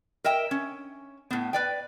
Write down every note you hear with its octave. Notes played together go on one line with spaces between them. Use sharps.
A#4 D#5 E5 G5
C#4
A2 B3
B4 D5 G5